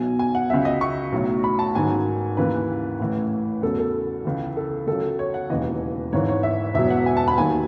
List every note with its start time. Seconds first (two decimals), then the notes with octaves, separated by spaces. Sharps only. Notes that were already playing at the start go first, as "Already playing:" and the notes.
Already playing: B1 B2 F#3 G#5
0.19 G#5
0.35 F#5
0.50 C#2 C#3 F#3 E5
0.65 D#5
0.81 C#6
1.12 B1 A2 F#3
1.44 B5
1.59 A5
1.75 A1 G#2 D#3 F#3 G#5
2.37 D#2 C#3 E3 B4
2.99 A1 A2 E3
3.62 E2 C#3 F#3 A4
3.79 A4
4.25 C#2 C#3 E3
4.57 A4
4.87 C#2 C#3 F#3 A4
5.19 C#5
5.34 F#5
5.50 E1 D#2 C#3 E3 D#5
6.13 G#1 G#2 E3 C#5
6.29 C#5
6.43 E5
6.74 E1 E2 B2 F#3 E5
6.90 F#5
7.06 G#5
7.17 A5
7.28 B5
7.37 D#2 D#3 F#3 G#5